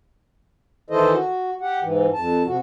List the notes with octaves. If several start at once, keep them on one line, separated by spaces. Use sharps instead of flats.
D#3 E3 E4 A4 C5 D#5
F#4
G4 F#5
G#2 E3
F2 A5
C3 F#4